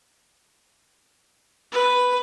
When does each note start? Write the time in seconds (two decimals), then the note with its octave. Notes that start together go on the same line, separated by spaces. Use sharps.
1.72 B4